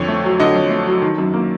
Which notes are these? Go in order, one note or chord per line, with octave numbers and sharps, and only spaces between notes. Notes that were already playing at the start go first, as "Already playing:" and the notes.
Already playing: F2 D3 C#5
A3
F#3
D3 D#5
F2
A3
F#3
D#3
F#2
A#3